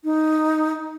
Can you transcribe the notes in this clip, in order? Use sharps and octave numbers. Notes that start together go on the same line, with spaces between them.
D#4